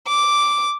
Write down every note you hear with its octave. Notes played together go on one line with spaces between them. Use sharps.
D6